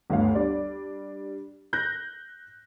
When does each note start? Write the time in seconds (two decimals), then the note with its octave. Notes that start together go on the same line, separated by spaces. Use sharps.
0.10 G1 D2 F5
0.35 G3 D4 D5
1.73 F#6 G6 A#6